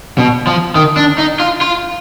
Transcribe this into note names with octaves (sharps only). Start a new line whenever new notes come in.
B2
F3
D#3
D4
D#4
F4
F4